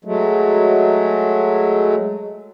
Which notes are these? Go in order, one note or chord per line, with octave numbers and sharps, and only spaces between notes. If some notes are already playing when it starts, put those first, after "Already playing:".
F#3 G#3 A3